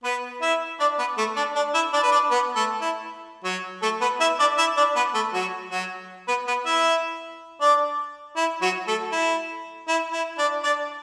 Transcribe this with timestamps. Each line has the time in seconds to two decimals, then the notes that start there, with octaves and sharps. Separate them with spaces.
0.04 B3 B4
0.41 E4 E5
0.80 D4 D5
0.98 B3 B4
1.18 A3 A4
1.36 D4 D5
1.56 D4 D5
1.74 E4 E5
1.93 D4 D5
2.03 B4
2.12 D4 D5
2.31 B3 B4
2.56 A3 A4
2.81 E4
3.44 F#3 F#4
3.82 A3 A4
4.01 B3 B4
4.20 E4 E5
4.39 D4 D5
4.58 E4 E5
4.77 D4 D5
4.96 B3 B4
5.14 A3 A4
5.33 F#3 F#4
5.71 F#3 F#4
6.28 B3 B4
6.47 B3 B4
6.66 E4 E5
7.61 D4 D5
8.36 E4
8.61 F#3 F#4
8.87 A3 A4
9.12 E4
9.88 E4
10.13 E4
10.38 D4 D5
10.63 D4 D5